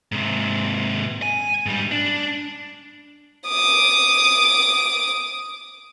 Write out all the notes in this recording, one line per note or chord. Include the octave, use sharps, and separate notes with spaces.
G#2 C3
G#5
G#2 G3
D4
D6 D#6